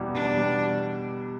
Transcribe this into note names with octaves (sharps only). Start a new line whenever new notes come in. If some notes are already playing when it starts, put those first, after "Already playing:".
Already playing: E2 B2 G3
E2 D4
B2 G3